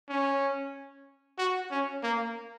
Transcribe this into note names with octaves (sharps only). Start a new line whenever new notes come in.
C#4
F#4
C#4
A#3